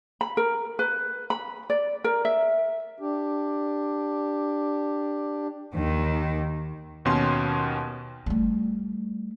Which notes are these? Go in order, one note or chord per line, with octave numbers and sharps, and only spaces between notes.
B5
A#4
B4
B5
D5
A#4
E5
D4 G4
D#2 D#3
D#2 B2 C#4 C6
G3 A3